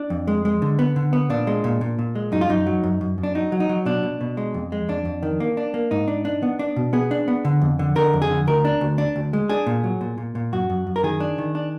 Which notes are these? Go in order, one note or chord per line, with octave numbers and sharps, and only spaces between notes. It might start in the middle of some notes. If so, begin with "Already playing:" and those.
Already playing: D4
F2
G#3
G#3
D3
B3
D3
B3
A#2 D4
G#3
A#2
A#2
A#2
G#3
F#2 D#4
F4
F#2 D#4
F#3
F#2
F#2
F#2
D4
F#3 D#4
F#3
D#4
F#3
B2 D4
B2
B2
G#3
F2
G#3
F2 D4
F2
D#3
A#3
D4
A#3
G#2 D#4
D4
D4
B3
D4
B2
B3 G#4
D4
B3
D3
F2
D3
D3 A#4
F2
G#4
D3
D2 A#4
D4
D2
D4
D2
G#3
D4 G#4
A#2
F#3
A#2
A#2
A#2
F#2 F#4
F#2
F#2
A#4
D#3 G#4
D4
D#3
D4